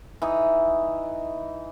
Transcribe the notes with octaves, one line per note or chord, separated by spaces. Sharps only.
E3 D#4